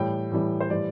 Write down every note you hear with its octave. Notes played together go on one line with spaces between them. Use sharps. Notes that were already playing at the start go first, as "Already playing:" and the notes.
Already playing: A2 E3 G3 G5
A2 E3 G3
C5
A2 E3 G3 D5